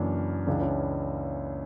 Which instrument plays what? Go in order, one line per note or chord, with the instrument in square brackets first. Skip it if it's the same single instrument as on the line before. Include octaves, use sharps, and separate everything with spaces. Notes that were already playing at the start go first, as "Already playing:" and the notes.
Already playing: [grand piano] F#1 F#2 E3 D4
C#2 C#3 E3 D4
C#4 E4